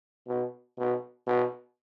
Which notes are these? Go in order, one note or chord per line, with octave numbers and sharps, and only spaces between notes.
B2
B2
B2